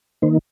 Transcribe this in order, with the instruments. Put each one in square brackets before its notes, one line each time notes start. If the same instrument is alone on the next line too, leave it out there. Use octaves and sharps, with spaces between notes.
[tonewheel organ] D#3 A#3 D#4 C5